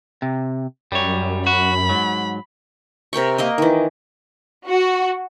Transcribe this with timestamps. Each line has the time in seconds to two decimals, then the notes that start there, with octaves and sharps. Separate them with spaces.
0.22 C3
0.92 F#2 G3 C#5
1.47 F#4 B5
1.89 G#2 F#3
3.13 C3 A#4 G5 C#6
3.38 A#3 A#4 D#5
3.58 D#3 E3
4.68 F#4